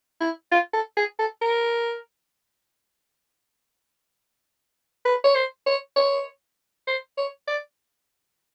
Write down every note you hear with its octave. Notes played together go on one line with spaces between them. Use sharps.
E4
F4
A4
G#4
A4
A#4
B4
C#5
C5
C#5
C#5
C5
C#5
D5